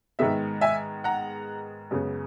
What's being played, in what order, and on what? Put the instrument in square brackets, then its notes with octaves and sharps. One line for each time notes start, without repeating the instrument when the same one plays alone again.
[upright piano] G#2 D#3 G#3 B3 E5
E5 G#5
F#5 A#5
F#2 C#3 G#3 B3